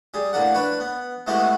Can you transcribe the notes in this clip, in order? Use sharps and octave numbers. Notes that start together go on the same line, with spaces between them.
G3 G#4
A2 A#3 D4 F#5
D4 B4 C#5
B3
G#3 A3 B3 E4 F#4 G4